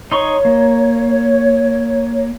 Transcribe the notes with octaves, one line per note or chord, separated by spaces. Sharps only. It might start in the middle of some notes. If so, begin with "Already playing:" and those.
D#4 C#5 C6 C#6
A#3